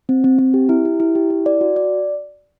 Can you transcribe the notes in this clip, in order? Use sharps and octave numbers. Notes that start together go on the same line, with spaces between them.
C4
C4
C4
G4
E4
G4
E4
G4
E4
D5
F#4
D5